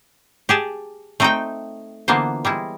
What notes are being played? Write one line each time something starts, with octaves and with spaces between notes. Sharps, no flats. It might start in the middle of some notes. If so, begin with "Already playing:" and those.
G4 G#4 A5
A3 C4 D#4 A4 E5 G5
D3 E3 A#3 B3 F4 C5
G3 G#3 E4